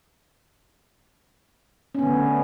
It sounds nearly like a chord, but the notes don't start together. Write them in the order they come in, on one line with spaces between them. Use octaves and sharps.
C#4 B3 D3 A3